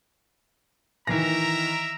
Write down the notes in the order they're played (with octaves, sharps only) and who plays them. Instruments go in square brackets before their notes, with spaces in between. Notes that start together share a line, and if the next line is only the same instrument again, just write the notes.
[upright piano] D#3 E3 A#6 [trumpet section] A#4 E5 A#5